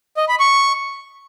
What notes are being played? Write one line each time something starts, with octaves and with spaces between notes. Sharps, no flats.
D#5
B5
C#6